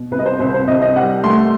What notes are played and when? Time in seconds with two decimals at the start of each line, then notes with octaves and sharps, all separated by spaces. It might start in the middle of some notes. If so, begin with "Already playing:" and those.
Already playing: B2
0.11 C2 B4
0.19 D#5
0.26 C5
0.39 C2 C5
0.54 C5
0.68 C2 D#5
0.82 D#5
0.96 G3 F#5
1.24 A3 C6